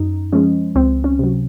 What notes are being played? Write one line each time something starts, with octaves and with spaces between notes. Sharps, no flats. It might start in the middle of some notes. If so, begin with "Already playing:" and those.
Already playing: F#2 D#4
F3 G#3 C#4
C#2 C4
C#4
C3 F#3